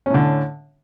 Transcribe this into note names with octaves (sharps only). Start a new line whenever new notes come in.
A2 D3 C#4